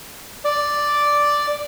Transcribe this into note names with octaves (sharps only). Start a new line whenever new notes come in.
D5